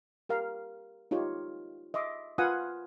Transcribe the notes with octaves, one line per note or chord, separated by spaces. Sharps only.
G4 A#4 F5
D#4 F4 G4 C#5
D#5 E5 C6 D6
F4 B4 F5 F#5 G#5 D#6